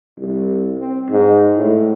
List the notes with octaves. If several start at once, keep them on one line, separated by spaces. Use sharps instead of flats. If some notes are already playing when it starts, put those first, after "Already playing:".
C2
C4
G#2
A2